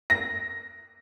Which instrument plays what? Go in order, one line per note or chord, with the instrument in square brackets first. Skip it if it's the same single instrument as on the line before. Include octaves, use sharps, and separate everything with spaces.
[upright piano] A#6